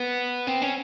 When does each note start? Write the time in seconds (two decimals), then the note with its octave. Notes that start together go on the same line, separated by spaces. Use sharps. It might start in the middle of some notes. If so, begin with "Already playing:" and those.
Already playing: B3
0.47 C4
0.62 C#4